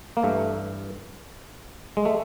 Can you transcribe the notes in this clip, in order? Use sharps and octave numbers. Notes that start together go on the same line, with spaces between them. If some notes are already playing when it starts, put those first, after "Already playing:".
A#3
G2 E3 A3
G#3
A3